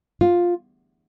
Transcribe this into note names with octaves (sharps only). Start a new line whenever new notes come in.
F4